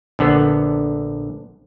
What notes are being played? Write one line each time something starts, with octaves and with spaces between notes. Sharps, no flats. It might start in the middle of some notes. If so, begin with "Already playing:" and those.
A#1 D3 B3